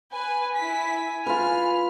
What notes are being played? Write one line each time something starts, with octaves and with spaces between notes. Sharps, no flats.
B4 G#5
E4 G#5 B6
F4 B4 F6